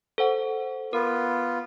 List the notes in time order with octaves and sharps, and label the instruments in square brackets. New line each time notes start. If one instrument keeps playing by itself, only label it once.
[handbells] A4 C5 F#5
[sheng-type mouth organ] B3 F4 [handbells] A#4